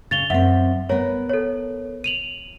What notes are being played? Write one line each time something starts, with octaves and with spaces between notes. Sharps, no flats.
C#3 A6 F7 G7
F#2 C4 E5 F#5
B3 A#4 C#5
A4 C#5
D#7 F7 F#7